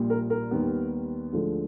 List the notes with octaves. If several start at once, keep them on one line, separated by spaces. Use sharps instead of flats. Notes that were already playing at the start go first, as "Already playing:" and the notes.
Already playing: A#1 A#2 G3
A#4
A#4
D#2 D#3 G3 B3
D2 D3 F3 G#3